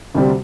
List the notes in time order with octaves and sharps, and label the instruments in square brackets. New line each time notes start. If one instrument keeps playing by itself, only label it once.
[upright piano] D2 C3 G3 C4